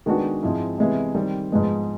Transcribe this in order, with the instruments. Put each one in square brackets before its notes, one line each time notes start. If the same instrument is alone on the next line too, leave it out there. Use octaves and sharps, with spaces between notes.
[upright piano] D#3 G#3 B3 D4 F#4
G#2 F3 G#3 C4 E4
C3 E3 G#3 B3 E4
D#3 G3 C4
G#2 F3 G#3 B3